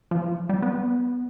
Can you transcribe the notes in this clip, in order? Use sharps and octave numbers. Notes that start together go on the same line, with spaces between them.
F3
G3
B3